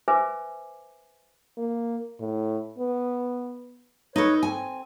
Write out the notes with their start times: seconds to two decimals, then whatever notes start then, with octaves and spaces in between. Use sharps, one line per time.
0.08 B4 C5 E5 G#5 D6
1.58 A#3
2.20 A2
2.78 B3
4.16 D#4 A4 B4 C#5
4.43 C4 G#5